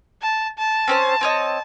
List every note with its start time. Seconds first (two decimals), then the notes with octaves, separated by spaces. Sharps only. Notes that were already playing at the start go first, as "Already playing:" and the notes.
0.22 A5
0.58 A5
0.88 C4 C#4 C5
1.21 C4 C#5 D#5